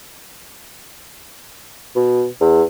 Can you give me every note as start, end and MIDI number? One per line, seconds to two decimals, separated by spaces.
1.96 2.26 47
2.41 2.63 40